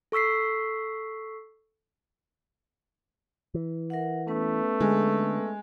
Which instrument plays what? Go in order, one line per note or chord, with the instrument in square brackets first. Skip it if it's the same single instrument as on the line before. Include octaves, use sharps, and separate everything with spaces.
[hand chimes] A4 C#6 E6 B6 C7
[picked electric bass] E3
[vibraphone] A#4 E5 F#5
[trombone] A3 [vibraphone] B3 C#4 B4
[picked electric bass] D3 [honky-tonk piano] G#3